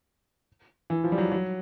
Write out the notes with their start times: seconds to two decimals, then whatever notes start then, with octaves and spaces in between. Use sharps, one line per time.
0.90 E3
1.04 F3
1.12 G3
1.18 F#3
1.32 F#3